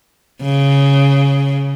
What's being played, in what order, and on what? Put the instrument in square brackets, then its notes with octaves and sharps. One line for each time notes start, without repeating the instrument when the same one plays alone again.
[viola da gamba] C#3